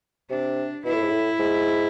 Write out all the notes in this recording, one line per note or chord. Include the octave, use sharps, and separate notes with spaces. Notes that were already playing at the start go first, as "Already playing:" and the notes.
C3 D4
B2 E4
A2
G#2
A2
G#2